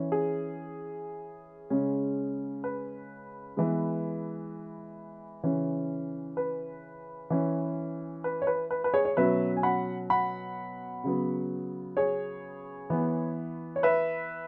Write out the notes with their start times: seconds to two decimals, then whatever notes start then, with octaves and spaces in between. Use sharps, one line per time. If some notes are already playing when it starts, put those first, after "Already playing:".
Already playing: E3 C#4
0.12 G#4
1.70 C#3 G#3 C#4
2.64 B4
3.57 E3 G#3 B3
5.44 C#3 E3 C#4
6.37 B4
7.30 E3 C#4
8.24 B4
8.42 C#5
8.47 B4
8.71 B4
8.84 B4
8.94 G#4 C#5
9.05 C#5
9.17 B2 F#3 C#4 B4 E5
9.57 G#5
9.63 F#5 B5
10.10 F#5 B5
11.04 C#3 F#3 B3
11.97 G#4 C#5
12.90 E3 B3
13.76 C#5
13.83 B4 E5